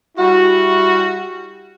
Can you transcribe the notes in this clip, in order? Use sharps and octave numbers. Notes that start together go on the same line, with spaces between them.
G3 E4 F#4